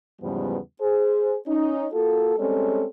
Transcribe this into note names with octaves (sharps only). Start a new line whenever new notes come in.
E2 G#2 C#3 F3 G3 B3
G#4 C5
C#4 D#4
A#3 F4 F#4 A4
G3 G#3 C4 C#4 A4